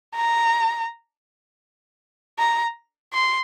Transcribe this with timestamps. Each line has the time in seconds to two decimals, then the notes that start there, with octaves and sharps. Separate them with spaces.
0.16 A#5
2.39 A#5
3.13 C6